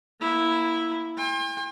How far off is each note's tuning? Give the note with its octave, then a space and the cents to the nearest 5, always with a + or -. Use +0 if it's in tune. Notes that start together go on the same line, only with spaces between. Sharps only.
A#3 +25 E4 +0
G5 +45 C6 +35